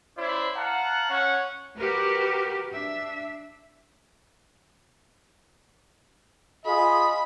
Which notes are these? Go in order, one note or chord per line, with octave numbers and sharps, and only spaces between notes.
C#4 E4 C5 D5
F5 F#5 A5 A#5
C#4 C#5 F#5
F#4 G4 A#4 B4
D4 E5
F4 G#4 D#5 B5